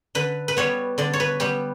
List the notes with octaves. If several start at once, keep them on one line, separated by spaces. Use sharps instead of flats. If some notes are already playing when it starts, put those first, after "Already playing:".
D3 B4
B4
G3 B3 C#5
D3 D5
C#5
B4
G3 B3 G4